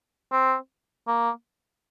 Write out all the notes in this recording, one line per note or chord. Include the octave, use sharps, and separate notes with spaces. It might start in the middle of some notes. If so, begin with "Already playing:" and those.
C4
A#3